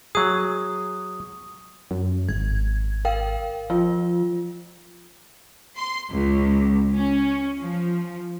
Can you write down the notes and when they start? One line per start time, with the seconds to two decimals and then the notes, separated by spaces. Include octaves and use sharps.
0.15 F#3 G#4 D#6
1.91 F#2
2.29 G#1 G#6
3.05 A#4 F5 G5
3.70 F3 F4
5.76 C6
6.12 C#2
6.95 C#4
7.62 F3